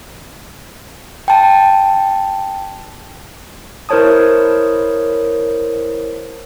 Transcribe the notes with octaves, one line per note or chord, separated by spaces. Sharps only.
G5 A5
E4 A#4 C5 C#5 A5 D#6